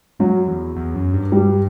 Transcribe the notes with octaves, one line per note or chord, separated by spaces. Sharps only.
F#2 F#3
E2
E2
F#2
G2
G3